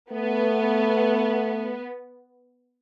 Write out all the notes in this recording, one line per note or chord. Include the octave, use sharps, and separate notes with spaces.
A3 B3